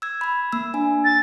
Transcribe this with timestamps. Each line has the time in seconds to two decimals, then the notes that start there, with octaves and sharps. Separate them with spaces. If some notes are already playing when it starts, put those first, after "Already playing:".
0.02 E6 G#6
0.21 B5 E6
0.52 A#3 E6
0.74 D4 G#5
1.05 A6